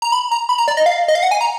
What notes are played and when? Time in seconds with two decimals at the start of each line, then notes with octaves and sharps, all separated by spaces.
0.02 A#5
0.12 B5
0.31 A#5
0.49 B5
0.58 A#5
0.68 D5
0.77 D#5
0.86 F5
1.08 D#5
1.15 F5
1.23 F#5
1.31 G#5
1.41 A#5